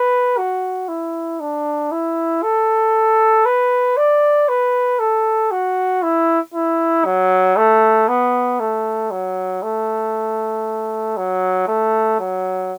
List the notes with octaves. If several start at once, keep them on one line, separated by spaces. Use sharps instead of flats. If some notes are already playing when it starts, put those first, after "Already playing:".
Already playing: B4
F#4
E4
D4
E4
A4
B4
D5
B4
A4
F#4
E4
E4
F#3
A3
B3
A3
F#3
A3
F#3
A3
F#3